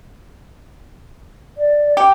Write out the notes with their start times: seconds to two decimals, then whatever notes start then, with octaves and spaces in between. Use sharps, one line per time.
1.57 D5
1.97 G4